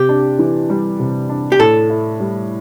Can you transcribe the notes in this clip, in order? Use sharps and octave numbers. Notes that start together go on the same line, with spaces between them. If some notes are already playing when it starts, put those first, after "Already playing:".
Already playing: C3 G4
D4
E3
G3
C3
D4
G4
A2 A4
E4
G3